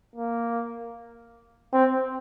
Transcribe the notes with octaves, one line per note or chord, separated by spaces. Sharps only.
A#3
C4